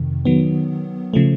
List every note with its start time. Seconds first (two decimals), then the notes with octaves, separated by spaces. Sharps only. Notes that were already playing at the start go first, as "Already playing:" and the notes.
Already playing: F2 C3 D#3
0.25 D#3 F#3 B3
1.14 C#3 F3 A3